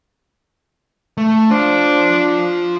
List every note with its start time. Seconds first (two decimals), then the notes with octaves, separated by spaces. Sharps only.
1.17 A3
1.50 D4 F4 C5